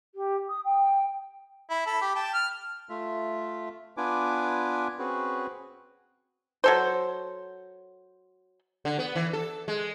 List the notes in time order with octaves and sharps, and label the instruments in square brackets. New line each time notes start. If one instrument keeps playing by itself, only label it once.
[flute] G4
D#6
G5
[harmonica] E4
A4 B5
G4
G5 A5
F6
[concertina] A3 F4 E5
B3 D4 F4 B4 G#5 D6
C4 C#4 F#4 G#4 B4
[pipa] F#3 A4 C5
[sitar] D3
B3
E3
A4
G#3